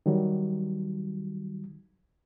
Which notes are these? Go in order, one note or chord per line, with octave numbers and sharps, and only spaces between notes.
D#3 F#3 G3